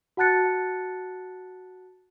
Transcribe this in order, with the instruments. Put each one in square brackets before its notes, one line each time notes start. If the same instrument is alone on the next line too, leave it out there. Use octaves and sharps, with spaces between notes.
[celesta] F#4 F#5 A5 F#6 A6 C#7